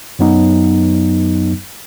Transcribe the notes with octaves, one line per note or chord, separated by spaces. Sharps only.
F#2 F#3 B3 D#4